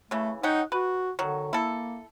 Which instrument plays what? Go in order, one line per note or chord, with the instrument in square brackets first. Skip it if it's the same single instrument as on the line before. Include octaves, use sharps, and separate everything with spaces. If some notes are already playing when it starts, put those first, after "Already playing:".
[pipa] C#3 E3 [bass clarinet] A3
[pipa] C#4 F#5 G5 [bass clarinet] D#4
[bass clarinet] F#4 [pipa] B4
[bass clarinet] D3 [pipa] D#3 F#3
[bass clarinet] A#3 [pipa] E4 A4